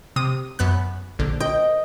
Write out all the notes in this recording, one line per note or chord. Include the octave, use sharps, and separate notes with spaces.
C3 D#6
F#2 B3 F#6
A#1 D3
D#5 G5